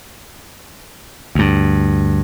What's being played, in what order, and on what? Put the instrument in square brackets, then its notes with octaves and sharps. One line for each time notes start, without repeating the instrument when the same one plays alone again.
[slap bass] D2 G2